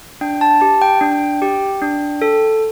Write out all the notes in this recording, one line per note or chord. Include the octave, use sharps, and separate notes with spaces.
D4 G5
A5
G4 A5
G5
D4
G4
D4
A4